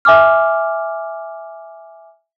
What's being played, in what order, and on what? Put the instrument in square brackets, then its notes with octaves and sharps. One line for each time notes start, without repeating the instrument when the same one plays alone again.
[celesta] E5 G#5 D6 F6